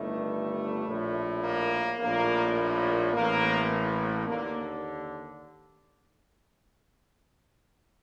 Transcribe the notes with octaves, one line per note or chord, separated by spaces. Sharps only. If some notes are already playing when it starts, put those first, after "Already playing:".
Already playing: G1 G2 D#3 A3
A#1 A2
A#3
A#1 A2 A#3
A#3
A1 A2 A#3
A#3
D#2 D3 A#3